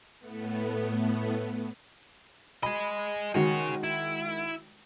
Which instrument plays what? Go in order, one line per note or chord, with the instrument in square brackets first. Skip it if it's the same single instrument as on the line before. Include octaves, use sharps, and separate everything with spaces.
[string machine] A2 A3 B3
[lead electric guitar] G#4 D#5 [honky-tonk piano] B5
[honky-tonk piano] D#3 G#3 F#4 [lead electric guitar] G#4 C#5
[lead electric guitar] E4